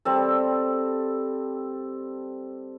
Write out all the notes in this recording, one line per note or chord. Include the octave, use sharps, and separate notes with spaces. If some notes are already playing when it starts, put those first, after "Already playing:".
G3 C4 A4